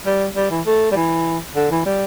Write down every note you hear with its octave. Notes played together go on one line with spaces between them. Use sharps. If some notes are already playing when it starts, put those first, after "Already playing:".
G3
G3
E3
A3
G3
E3
D3
E3
G3